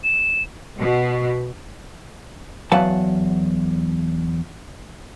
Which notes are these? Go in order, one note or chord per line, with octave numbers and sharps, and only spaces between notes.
E7
B2
E2 F#3 B4 F5 F#5 A5